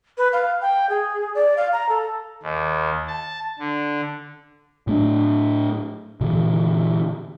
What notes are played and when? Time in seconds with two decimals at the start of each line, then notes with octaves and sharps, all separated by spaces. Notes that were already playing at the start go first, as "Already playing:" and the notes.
0.18 B4
0.33 F5
0.61 G5
0.89 G#4
1.35 D5
1.57 F5
1.73 A#5
1.89 A4
2.43 D#2
3.08 A5
3.59 D3
4.87 A2 A3 D4
6.21 A#2 D3 E3